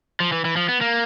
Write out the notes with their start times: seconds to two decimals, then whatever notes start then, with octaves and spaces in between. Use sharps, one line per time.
0.20 F3
0.32 E3
0.45 E3
0.56 F3
0.69 B3
0.81 A#3